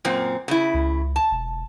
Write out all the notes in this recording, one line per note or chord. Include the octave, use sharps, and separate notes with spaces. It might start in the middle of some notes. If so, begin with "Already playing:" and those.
F#2 A#2 C4
C#3 E4
C#2
A5
E1